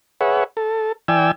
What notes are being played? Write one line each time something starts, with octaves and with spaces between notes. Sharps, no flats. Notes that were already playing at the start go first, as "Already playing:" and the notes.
G#4 B4 C#5 E5 F#5
A4
E3 D5 G5 G#5 E6